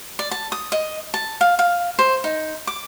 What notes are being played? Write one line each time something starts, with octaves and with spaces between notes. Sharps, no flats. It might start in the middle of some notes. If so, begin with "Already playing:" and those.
D5
A5
D#6
D#5
A5
F5
F5
C5
D#4
D6